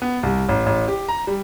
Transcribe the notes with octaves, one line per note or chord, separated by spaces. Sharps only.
B3
C2
A1
A1
G4
A#5
G3